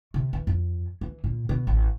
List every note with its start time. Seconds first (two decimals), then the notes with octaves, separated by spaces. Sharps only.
0.14 C3
0.33 E3
0.47 F2
1.01 E3
1.24 A#2
1.49 B2
1.67 A1